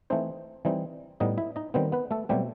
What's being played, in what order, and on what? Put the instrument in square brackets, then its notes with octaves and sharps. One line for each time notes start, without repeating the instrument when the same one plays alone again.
[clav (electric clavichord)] E3 A3 C4 D#4 C5
E3 G3 C4 D#4
A2 G3 B3 D#4 D#5
E4 E5
D#4 D#5
D#3 G3 B3 C4 C5
B3 B4
A3 A4
B2 F#3 G3 A3 C4 G4